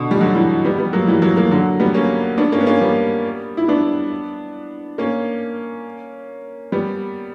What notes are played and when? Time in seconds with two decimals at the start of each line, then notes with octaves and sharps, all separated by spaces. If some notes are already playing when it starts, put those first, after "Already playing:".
Already playing: B2 D3
0.11 G3
0.21 D3 F#3
0.35 E3 G3
0.65 G3 B3
0.78 G3 B3
0.93 F#3 A#3
1.07 E3 G3
1.22 F#3 A#3
1.37 F#3 A#3
1.51 D3 F#3
1.80 G3 B3
1.94 A#3 C#4
2.37 B3 D4
2.52 A#3 C#4
2.60 B3
2.67 A#3 C#4
2.81 G3 B3
3.57 E4
3.68 B3 D4
4.98 A#3 C#4
6.72 G3 B3